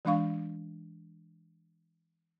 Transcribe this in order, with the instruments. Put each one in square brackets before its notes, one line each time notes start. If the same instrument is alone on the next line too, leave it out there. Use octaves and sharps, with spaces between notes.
[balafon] E3 G#3 D4 F5 C#6